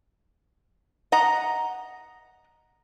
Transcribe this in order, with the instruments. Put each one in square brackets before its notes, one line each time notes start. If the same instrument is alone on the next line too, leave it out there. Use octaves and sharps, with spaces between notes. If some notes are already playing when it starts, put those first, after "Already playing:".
[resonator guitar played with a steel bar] D#5 F#5 A#5